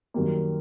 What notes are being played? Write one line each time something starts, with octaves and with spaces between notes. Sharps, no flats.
F#2 D#3 G3 A#3